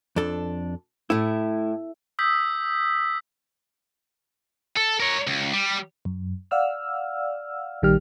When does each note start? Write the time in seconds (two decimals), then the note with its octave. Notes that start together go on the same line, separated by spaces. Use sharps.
0.16 F2 D4 A4
1.10 A2 A3 E4
2.19 D#6 E6 G6 B6
4.76 A4
5.00 A#4 C#5
5.27 C#2
5.53 G3
6.05 F#2
6.51 D5 F5 F#5 E6 F6
7.82 A#1 D#3 G3 G4 F6